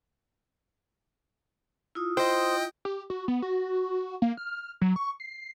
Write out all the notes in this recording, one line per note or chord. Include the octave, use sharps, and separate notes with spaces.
E4 F4 D#6
C5 D#5 G5
G4
F#4
B3
F#4
A#3
F6
F#3
C#6
C7